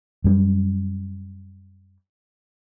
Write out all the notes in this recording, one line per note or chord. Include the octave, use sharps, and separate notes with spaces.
F#2 G3